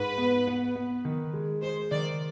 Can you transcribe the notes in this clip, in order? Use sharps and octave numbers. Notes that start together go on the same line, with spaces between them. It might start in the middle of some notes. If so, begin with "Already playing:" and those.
Already playing: G#2 B4
B3
B3
B3
D#3
G#3
G#3 C5
D#3 D5